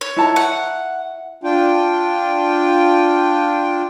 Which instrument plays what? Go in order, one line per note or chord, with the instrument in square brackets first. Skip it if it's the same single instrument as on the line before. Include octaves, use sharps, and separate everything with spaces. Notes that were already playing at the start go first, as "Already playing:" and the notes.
[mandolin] C#5
[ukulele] E4 A5 A#5
[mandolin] F#5
[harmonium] D4 F4 G5